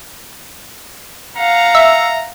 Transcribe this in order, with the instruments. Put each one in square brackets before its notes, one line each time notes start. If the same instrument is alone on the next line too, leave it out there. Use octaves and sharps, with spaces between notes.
[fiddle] F5 F#5 [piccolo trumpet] A#5
[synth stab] E5